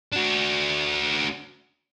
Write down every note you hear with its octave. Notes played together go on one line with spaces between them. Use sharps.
D4 F#4